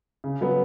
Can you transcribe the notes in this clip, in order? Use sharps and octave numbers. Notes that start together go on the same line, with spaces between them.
C#3
F#3 B3